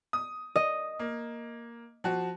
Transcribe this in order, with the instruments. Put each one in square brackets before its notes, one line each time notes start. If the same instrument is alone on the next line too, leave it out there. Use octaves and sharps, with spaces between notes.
[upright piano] D#6
[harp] D#5
[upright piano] A#3
F3 F#4